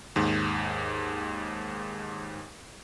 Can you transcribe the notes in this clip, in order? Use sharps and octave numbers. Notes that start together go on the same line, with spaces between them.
D#2 G#2